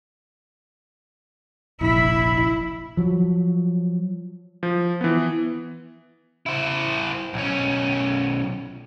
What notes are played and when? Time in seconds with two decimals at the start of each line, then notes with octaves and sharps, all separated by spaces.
1.81 F1 A#1 E4
2.97 F3 F#3
4.63 F3
5.01 E3 B3
6.46 E4 C5
7.34 B1 C#4